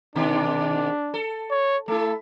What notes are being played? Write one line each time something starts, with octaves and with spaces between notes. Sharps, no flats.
G#2 B2 D#3 D4
A4
C#5
A3 E4 A4